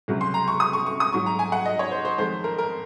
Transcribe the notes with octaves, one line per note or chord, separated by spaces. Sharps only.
C#2 C3 F#3
C6
A#5
C#6
D#6
C#6
C#6
D#6
G#2 F#3 C#6
A#5
G#5
F#5
D#5
C#5
C5
C5
F2 D#3 G#3 C5
A#4
A#4